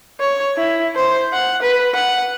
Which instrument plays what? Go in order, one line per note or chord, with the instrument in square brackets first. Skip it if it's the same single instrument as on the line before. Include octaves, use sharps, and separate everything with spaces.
[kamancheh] C#5
E4
C5
F#5
B4
F#5